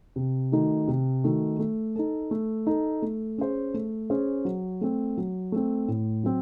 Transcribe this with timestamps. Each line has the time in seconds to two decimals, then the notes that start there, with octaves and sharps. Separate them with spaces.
0.16 C3
0.52 D#3 A3 D#4 F#4
0.88 C3
1.24 D#3 A3 D#4 F#4
1.59 A3
1.96 D#4 A4
2.31 A3
2.67 D#4 A4
3.02 A3
3.38 C#4 G#4 C5
3.74 A3
4.10 C#4 G#4 C5
4.45 F#3
4.81 A3 C4
5.17 F#3
5.52 A3 C4
5.88 A2
6.24 F#3 C4